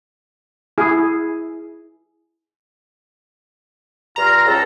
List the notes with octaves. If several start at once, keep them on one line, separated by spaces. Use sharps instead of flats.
E4 G#4
G2 F4 A#5
C#2 A4